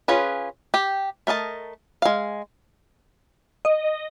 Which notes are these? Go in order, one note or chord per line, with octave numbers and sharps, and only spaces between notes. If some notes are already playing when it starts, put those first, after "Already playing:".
C#4 F4 G#4 B4
G4 G5
A3 A#4 D#5 A5
G#3 F5
D#5